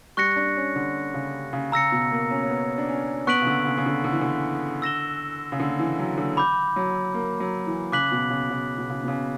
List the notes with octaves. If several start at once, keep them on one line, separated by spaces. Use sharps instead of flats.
G3 C#6 F#6 A#6 C#7
D4
C#4
D3
C#3
C#3
C#3 A#5 E6 A#6 C#7
B2
A#3
C#4
C#4
B3
D4
C#4
B3 C#6 F#6 B6 D7 F#7
C#3
D3
C#3
C#3
D3
D3
E3
D3
E6 A#6 E7 G7
C#3
D3
E3
F#3
D3
B5 D6 G6
F#3
A#3
F#3
E3
C#3 D6 F#6 B6 F#7
B2
C#3
C#3
B2
C#3
B2
C#3